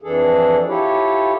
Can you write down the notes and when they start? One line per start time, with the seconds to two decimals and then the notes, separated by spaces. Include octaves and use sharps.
0.02 F2 E3 D4 G#4 A4
0.68 E4 F4 G4 A4 C#5